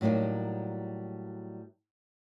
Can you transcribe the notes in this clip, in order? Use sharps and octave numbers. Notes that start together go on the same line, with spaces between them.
A2 F#3 G3 A#3 D#4